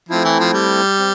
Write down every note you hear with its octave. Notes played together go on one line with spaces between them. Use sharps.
F3 A3 C4 E4
E3
F3
G3
C4